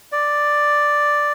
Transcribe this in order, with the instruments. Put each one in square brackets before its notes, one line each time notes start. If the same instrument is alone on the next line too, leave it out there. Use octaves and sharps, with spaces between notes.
[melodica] D5